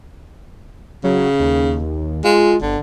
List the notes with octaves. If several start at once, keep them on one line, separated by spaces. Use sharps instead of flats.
C#3 F#3
D#2
G#3 F4
G1 D3